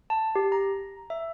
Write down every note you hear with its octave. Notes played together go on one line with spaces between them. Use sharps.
A5
G4
A#5
E5